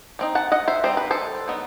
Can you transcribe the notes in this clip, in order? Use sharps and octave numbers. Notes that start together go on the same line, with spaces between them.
G3 C4 D#4
F#5 A5
D#5 F#5
C5 E5
G3 C4 D#4 C5
B4
A4 C5
F#3 B3 D#4